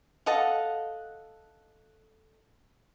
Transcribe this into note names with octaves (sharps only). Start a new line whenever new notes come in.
A4 D#5 F5 F#5